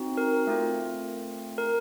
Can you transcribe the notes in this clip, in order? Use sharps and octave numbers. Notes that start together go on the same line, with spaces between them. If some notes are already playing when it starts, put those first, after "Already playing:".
Already playing: C4 D#4 F#4
A#4
A3 C4 F4
A#4